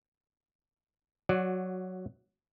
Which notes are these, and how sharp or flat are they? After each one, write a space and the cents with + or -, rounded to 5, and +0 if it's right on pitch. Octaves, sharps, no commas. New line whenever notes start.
F#3 +0 F#4 -20 D5 +0